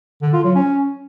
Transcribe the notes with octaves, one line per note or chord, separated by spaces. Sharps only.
D3
F4
F#3
C#4